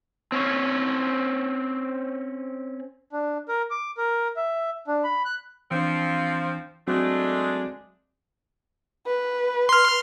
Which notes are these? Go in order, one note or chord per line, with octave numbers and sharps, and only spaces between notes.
C4 C#4 C#5
D4
A#4
D6
A#4
E5
D4
B5
F#6
E3 F3 C4 D4
F#3 G#3 A3 C4 D4 F#4
B4
C6 F6